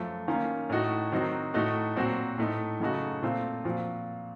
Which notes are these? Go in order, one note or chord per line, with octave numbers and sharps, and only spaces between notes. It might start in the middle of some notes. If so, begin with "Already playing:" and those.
Already playing: F#2 F3 A3
D#3 A#3 C#4 F4
A2 A3 D#4 F#4
D#3 F#3 C4 D#4 F#4
A2 A3 D#4 F#4
A#2 F#3 C4 F#4
A2 A3 D#4
F#2 C#3 A3 D#4 F#4
A#2 A3 C4 F4
A#2 F3 C4 F#4